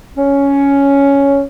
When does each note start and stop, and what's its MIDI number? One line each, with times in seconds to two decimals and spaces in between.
0.17 1.41 61